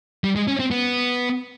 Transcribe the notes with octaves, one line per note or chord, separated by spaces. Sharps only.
G3
G#3
C#4
C4
B3